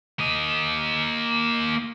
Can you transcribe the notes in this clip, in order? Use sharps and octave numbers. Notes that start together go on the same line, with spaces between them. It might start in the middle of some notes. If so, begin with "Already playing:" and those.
A#3 D#5